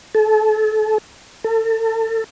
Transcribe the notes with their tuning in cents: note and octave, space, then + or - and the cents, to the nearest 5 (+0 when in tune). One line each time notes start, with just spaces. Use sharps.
A4 -30
A4 +35